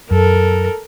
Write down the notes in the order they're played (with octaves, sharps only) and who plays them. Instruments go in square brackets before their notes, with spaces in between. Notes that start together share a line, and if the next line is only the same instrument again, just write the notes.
[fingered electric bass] F#2 [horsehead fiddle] A4 A#4